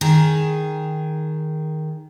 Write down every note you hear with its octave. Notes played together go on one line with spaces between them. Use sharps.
D#3 G#4